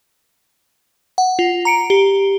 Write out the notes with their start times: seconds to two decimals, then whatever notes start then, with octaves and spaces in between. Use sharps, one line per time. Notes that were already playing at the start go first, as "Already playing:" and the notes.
1.18 F#5
1.39 F4
1.65 A#5 C#7 D7
1.90 G4